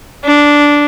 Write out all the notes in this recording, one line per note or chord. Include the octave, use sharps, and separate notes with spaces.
D4